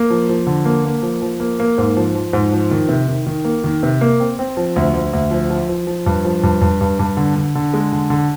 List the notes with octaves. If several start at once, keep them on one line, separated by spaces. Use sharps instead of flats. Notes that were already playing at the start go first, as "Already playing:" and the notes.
Already playing: A#3
F3
F3
D3
A#3
A#3
F3
F3
A#3
A#3
G#2
F3
F3
G#2
F3
D#3
C3
D#3
D#3
A#3
D#3
C3
A#3
C4
C4
F3
D2
D2
D2
F3
F3
F3
F3
G2
F3
G2
G2
G2
G2
D3
D3
D3
G#3
D3
D3